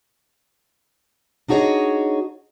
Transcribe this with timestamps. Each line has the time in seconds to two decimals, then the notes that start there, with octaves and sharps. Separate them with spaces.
1.48 D4 D#4 F#4 G#4 C#5 D#5